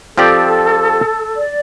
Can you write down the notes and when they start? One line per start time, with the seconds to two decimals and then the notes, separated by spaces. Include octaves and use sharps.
0.17 F3 C4 G4 A4 D5
1.36 D5